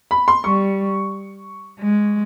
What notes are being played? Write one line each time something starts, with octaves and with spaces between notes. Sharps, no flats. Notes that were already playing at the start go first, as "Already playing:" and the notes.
B5
C6
G3 C#6
G#3